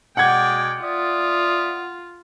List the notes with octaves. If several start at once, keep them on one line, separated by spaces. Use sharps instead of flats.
B2 G#3 D5 F#5 G5 G#6
F4 D5 E5 D#6